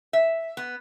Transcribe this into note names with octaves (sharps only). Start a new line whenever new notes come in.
E5
B3